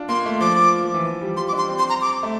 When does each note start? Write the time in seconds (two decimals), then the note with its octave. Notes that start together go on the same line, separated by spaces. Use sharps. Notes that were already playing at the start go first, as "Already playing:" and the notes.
Already playing: D4 F4
0.09 A#3 C6
0.25 A3
0.41 F3 D6
0.84 F3
0.94 E3
1.05 F3
1.21 G3
1.37 G3 C6
1.48 D6
1.53 D4
1.58 C6
1.68 C4
1.79 C6
1.89 A#5
2.01 D6
2.23 A3